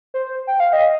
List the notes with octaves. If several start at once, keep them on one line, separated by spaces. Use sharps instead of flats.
C5
G5
F5
D#5